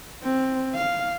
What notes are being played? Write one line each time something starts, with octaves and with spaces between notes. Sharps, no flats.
C4
F5